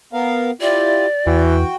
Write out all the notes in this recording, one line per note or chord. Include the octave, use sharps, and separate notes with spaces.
B3 A#4 F5
E4 F4 G4 D5
E2 E3 F#4 G5